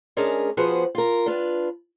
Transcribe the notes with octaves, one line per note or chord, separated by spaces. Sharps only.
G#3 C#4 D4 G#4 A#4
F3 B3 F#4 G#4 B4 C5
F4 A#4
D4 F4 B4